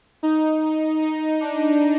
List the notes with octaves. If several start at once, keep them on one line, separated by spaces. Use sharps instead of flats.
D#4
D#4
D4